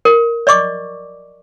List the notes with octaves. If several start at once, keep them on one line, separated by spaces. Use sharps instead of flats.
A#4
D5 D#5 C#6 D6